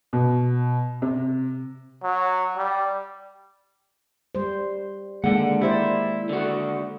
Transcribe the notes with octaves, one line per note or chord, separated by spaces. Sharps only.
B2
C3
F#3
G3
G3 C5
D3 D#3 G#3 A#3 F#5
E4 G4 C5 D5
D3 F#4